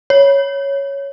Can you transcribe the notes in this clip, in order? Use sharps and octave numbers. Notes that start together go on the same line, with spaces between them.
C#5